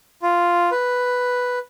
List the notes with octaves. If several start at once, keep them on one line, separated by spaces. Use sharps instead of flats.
F4
B4